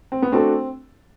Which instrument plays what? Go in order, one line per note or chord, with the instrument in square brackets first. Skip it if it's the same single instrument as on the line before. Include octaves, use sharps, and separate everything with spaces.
[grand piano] C4
B3
[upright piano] A3 D4 F#4 A4 [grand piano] C4